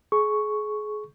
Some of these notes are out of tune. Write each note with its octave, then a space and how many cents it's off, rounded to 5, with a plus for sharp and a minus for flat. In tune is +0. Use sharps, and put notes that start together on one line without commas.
G#4 +30 C#6 +0